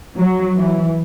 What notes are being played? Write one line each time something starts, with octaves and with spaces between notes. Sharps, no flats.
F#3
E3